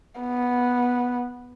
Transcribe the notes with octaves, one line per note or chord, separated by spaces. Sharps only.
B3